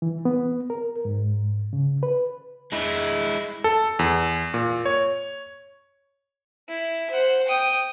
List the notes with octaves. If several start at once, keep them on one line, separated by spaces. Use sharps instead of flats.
E3
B3
A#4
G#2
C#3
B4
G#3 E4
A4
E2
A#2
C#5
E4
C5 F#5
G5 D#6